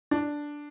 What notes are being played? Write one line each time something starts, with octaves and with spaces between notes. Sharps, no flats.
D4